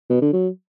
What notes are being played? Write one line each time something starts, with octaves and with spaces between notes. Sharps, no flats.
B2
D3
F#3